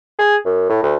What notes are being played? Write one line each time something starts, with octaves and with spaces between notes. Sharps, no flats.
G#4
F#2
A2
D2